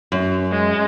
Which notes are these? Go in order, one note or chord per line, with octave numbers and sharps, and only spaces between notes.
F#2
G#3